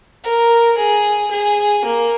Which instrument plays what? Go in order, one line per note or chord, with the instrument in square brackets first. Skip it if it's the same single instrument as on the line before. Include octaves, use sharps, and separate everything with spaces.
[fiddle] A#4
G#4
G#4
A#3